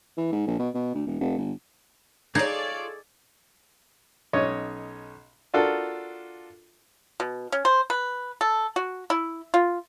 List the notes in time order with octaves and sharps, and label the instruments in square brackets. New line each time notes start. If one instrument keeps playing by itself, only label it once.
[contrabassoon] E3
G#2
A#1
B2
B2
D2
E1
F1
G1
[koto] D#4 [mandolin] F4 C#5 [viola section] G#4 A4 D5 [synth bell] G#6
[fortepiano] B1 C#4 C#5 D#5
D4 F4 F#4 A4 A#4
[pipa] B2
C#4
C5
B4
A4
F#4
E4
F4